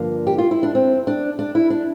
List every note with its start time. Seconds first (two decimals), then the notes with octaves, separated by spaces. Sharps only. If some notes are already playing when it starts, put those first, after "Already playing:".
Already playing: G2 D3 F3 A#3
0.27 G4
0.38 F4
0.51 E4
0.63 D4
0.75 C4
1.07 D4
1.39 D4
1.55 E4
1.70 D4